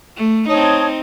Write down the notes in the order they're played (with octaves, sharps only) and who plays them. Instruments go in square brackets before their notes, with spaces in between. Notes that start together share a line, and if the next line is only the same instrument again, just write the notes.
[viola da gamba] A3
[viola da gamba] C4 D#4 [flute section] C#5 A5 D#6